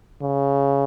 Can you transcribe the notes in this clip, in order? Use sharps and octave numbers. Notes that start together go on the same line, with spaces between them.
C#3